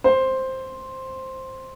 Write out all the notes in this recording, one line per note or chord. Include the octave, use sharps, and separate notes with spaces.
C5